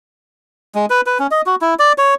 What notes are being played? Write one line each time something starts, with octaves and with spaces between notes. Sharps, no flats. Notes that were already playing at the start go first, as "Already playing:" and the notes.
G#3
B4
B4
C#4
D#5
F#4
E4
D5
C#5